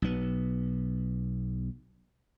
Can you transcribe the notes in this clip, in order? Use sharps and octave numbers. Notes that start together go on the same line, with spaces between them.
B1 B3